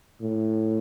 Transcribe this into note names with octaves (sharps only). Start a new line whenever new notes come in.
A2